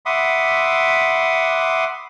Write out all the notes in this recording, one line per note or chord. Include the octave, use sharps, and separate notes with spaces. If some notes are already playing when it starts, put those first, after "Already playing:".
E5 F#5 B5 C6 D6 D#6